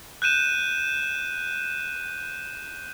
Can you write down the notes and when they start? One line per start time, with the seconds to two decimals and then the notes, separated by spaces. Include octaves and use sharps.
0.22 F#6 G6 D#7 E7